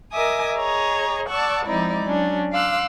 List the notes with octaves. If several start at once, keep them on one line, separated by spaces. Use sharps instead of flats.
A#4 D#5 E5 G#5 D6 D#6
G#4 C#5 D#5 A#5
D5 F#5 A5 C#6 D6 E6
F3 G#3 C4 D#4 E4 D5
F#3 C#4 D4
F5 C6 D6 E6 F#6